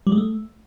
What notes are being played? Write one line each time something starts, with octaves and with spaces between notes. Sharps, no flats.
G3
G#3
A3